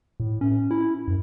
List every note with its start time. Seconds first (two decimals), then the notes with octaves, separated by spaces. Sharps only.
0.20 A2
0.41 C#4
0.71 E4
1.08 F#2